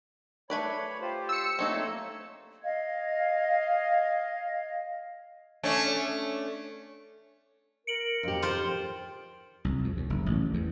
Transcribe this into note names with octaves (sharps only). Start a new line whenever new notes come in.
A3 B4 C#5 D5 B5
F4 G4 C5
E6 C#7
A3 A#3 C4 D#4 A4 C#5
D#5 F5 G#6
A3 C#4 D4
A#4 C#7 D7 F#7
F2 G4
F4 C5
C2
F2
D#2
F#1
A1
E2